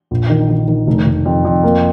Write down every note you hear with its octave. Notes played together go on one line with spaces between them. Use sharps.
A#1
D#3
D#3
D#3
F1
F1
F2
F2
A#3